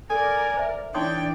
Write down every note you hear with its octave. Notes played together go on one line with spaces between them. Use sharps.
A4 A#4 D5 G#5
C5 E5
E3 D4 D#4 C#5 D5 G5 C6 D#6